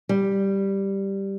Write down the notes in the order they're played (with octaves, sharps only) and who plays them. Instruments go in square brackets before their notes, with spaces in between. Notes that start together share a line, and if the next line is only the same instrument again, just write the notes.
[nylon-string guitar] G3